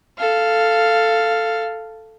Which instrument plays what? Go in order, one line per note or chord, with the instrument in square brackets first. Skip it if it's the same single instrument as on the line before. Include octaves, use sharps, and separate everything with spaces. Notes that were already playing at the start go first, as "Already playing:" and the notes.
[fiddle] A4 F5